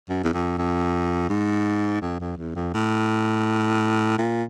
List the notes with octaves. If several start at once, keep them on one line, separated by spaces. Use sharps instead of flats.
F#2
E2
F2
F2
G#2
F2
F2
E2
F2
A2
A#2